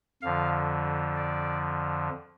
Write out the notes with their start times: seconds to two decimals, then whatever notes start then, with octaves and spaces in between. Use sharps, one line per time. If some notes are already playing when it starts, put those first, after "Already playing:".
0.22 F2 D3 F3 F5
1.16 D5